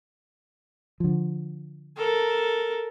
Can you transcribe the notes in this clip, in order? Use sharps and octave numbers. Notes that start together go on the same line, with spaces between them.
D3 F3
A4 A#4